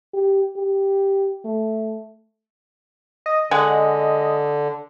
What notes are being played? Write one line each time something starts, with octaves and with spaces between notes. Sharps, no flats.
G4
G4
A3
D#5
D3 G#3 F#5